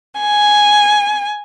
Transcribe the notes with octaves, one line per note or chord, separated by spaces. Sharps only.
G#5